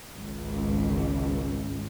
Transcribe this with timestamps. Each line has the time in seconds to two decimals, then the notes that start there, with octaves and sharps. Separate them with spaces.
0.17 G#1 C#2